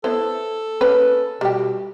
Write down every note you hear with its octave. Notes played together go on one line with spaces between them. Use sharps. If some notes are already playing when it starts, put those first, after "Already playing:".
B3 E4 A4 C5
A#3 C#4 B4
B2 G3 G4